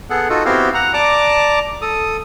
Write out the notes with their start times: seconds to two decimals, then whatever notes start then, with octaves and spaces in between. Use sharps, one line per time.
0.10 B3 G#4 A4 F#5
0.29 D#4 F4 F#4 A4
0.45 B3 C4 E4 F#4 G4 F5
0.74 F#5 A#5
0.94 D5 A5 A#5 D6
1.82 A4 D#6